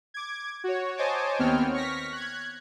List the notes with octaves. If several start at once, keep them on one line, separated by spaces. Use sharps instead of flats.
D6 G#6
F#4 C#5
C5 C#5 D#5 G#5 A5 D6
D#2 B3 C4 C#5 G5 F6
C#6 F6 A#6 B6
F#6 G#6